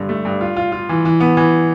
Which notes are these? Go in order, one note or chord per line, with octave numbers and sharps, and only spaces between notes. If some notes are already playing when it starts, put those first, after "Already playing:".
Already playing: G2 D3
A3
G2
F4
F4
F4
E3
E3
B3
E3